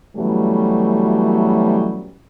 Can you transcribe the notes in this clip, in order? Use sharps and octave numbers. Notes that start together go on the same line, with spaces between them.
B2 E3 F#3 G3 A3 C#4